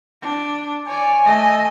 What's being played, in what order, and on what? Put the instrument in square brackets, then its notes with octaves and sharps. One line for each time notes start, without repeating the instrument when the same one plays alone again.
[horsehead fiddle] D4
[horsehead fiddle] C#5 D5 [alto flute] G#5
[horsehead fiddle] A3 D#5